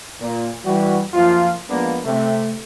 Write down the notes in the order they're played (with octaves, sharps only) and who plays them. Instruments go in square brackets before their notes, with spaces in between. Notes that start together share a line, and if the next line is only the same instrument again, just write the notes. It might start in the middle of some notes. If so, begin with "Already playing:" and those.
[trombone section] A#2
E3 G3 F#4
F#2 F3 A#3 F4
F3 G#3 A#3 B3 D4
C3 A3